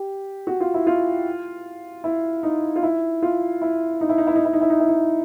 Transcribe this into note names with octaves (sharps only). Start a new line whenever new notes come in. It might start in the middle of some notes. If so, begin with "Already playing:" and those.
Already playing: G4
F#4
F4
E4
F4
E4
D#4
F4
E4
F4
E4
D#4
E4
D#4
E4
D#4
E4
D#4
E4
D#4
E4
D#4